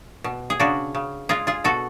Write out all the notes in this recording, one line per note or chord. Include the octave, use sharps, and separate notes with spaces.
B2
G#4
C#3 D4 F#4
C#3
G#3 F4 G#4
F4 G#4
B2 F#4 A4